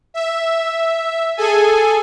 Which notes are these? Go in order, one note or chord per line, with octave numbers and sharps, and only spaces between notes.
E5
G#4 A4 G#5